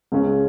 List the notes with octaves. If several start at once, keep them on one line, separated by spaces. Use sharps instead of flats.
C#2 C#3 G#3 C#4